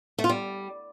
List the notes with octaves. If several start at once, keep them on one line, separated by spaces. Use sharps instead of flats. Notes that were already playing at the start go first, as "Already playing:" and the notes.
A3
F4
G3